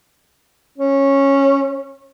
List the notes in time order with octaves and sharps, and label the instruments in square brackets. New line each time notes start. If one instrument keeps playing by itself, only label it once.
[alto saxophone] C#4